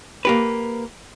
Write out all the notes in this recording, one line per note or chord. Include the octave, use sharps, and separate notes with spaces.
A#3 G4 B4